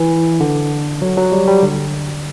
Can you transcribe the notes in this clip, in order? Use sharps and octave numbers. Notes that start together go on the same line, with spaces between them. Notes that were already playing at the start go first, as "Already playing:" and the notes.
Already playing: E3
D3
F#3
F#3
G3
G3
D3